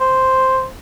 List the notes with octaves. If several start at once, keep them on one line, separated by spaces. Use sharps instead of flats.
C5